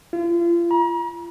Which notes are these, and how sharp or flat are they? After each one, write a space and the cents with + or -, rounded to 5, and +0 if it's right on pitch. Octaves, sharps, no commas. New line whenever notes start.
F4 -35
A#5 +40